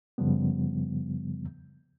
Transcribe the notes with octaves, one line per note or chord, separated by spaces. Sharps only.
F#2 C#3 F3 G3 B3